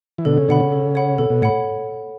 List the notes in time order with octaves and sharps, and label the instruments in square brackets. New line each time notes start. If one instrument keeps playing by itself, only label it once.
[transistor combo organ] E3
[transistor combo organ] B2 D3 [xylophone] A4
[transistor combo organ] C#3
[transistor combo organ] B2 D3 [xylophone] C#5 F#5 B5
[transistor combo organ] C#3
[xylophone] A4
C#5 F#5 B5
[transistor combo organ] B2 [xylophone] A4
[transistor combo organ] B2
[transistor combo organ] A2 [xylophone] C#5 F#5 B5